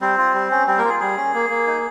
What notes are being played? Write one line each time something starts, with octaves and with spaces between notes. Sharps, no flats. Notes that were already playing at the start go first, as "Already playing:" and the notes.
G3 C4 C5
F4
G3
C#4
G3 C4 C5
A#3 A#4
F4 G#4
G3 G#4
C#4
A#3
A#3
D#4